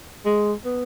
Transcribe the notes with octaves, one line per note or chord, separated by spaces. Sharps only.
G#3
B3